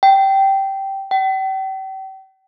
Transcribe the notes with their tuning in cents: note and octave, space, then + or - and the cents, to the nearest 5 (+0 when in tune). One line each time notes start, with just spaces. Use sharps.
G5 -10
G5 -40